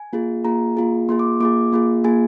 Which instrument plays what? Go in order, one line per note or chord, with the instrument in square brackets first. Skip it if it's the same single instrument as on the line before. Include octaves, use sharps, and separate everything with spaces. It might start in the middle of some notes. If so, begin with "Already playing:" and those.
Already playing: [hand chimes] G#5
A#3 F4 G#4
A#3 F4 G#4 A#5
A#3 F4 G#4
A#3 F4 G#4 C6
D6
A#3 F4 G#4 D6
A#3 F4 G#4
A#3 F4 G#4 G#5